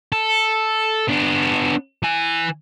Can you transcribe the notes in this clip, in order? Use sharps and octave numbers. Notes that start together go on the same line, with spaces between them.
A4
B3 D4
E3 G#5